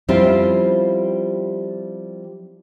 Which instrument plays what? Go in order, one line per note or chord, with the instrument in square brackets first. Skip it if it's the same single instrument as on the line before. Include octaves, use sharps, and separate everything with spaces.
[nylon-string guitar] F3 G3 C4 C#4 E4 F4